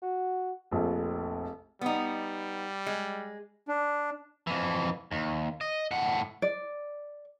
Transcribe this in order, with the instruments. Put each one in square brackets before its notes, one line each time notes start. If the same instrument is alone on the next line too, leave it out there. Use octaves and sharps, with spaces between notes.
[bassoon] F#4
[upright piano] F1 A#1 F2
[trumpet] G3 [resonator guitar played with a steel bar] B3 D#4
[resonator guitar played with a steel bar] G#3
[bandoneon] D4
[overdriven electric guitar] F2 E3
D#2
D#5
A2 F#5
[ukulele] D5